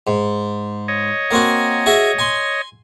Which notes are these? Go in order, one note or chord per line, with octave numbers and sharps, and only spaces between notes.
G#2
C#5 D#5
A#3 C4 F#4
F#4 G#4 E5
G#5 C6